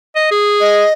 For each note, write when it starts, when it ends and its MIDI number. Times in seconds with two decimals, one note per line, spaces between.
0.16 0.29 75
0.31 0.86 68
0.60 0.93 75